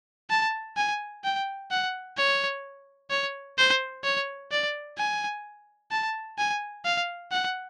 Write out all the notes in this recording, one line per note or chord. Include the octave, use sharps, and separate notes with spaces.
A5
G#5
G5
F#5
C#5
C#5
C5
C#5
D5
G#5
A5
G#5
F5
F#5